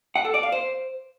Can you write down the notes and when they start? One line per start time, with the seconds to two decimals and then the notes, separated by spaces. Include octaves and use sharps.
0.16 F#5
0.25 A4
0.34 D5
0.43 F5
0.52 C5